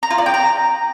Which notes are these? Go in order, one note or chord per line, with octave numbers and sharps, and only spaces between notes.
A#5
F4
D5
G5
A#5